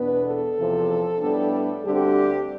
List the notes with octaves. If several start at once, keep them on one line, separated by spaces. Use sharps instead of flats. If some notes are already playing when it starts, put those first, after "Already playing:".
Already playing: E2 B2 B3 D4 B4
A4
E2 C3 F3
A2 G3 B3 D4
D2 D3 G3 C4 G4